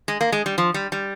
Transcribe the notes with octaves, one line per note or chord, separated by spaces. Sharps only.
G#3
A#3
G#3
G3
F3
G3
G3